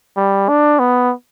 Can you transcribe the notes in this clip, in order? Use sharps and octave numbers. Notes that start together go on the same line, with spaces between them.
G3
D4
B3